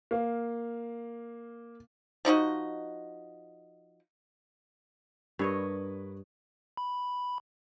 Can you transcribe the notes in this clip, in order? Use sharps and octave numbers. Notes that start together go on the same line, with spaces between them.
A#3 F5
F3 D#4 F#4 D#5
G2 D4 A#4 B4 C#5 D#5
B5